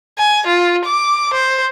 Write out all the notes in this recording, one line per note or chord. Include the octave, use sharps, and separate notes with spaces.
G#5
F4
D6
C5